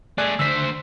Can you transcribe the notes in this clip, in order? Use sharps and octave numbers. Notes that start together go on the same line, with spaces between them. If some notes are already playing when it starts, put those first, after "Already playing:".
A3 G#4 D5 G#5 F#6
D2 C5 E6 B6